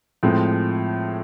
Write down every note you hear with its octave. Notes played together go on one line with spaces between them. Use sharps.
A2 F3 G#3 C4